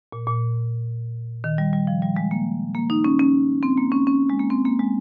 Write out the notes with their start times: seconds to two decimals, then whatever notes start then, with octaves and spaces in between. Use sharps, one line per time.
0.12 A#2
0.27 A#2
1.44 D#3
1.58 G3
1.73 G3
1.87 F3
2.02 G3
2.16 G#3
2.31 A#3
2.75 A#3
2.90 D#4
3.04 C#4
3.19 C#4
3.63 C4
3.78 A#3
3.92 C#4
4.07 C#4
4.30 G#3
4.40 A#3
4.50 C4
4.65 A#3
4.79 G#3